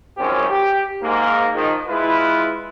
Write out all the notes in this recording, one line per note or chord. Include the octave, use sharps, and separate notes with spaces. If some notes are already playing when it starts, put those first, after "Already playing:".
G#1 F#2 F3 C4 C#4 G4
G4
G#2 A#3
D#3 F3 G#3
G#3 E4 F4 B4